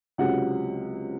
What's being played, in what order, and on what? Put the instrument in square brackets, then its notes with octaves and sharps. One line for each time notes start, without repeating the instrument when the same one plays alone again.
[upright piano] C#2 C3 F#3 F#5